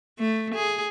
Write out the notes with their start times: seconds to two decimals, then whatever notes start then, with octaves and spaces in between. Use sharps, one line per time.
0.19 A3
0.55 G#4